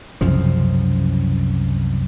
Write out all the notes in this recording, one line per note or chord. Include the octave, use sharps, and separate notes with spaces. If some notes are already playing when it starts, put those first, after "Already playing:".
C2 F#2 C#3 F3